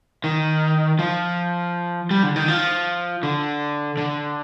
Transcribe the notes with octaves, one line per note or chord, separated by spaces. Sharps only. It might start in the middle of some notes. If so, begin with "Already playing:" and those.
D#3
F3
G3
D3
D#3
F3
D3
D3